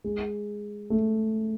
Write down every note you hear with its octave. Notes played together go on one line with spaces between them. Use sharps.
G#3
A3